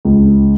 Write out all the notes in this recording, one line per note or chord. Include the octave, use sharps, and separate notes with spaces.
C#2